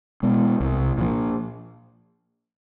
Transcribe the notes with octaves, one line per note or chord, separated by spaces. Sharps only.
B2 G#3 B3
C2
A#2 F3